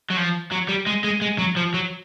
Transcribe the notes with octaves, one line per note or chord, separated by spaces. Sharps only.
F#3
F3
F#3
G3
G#3
G#3
G#3
F#3
F3
F#3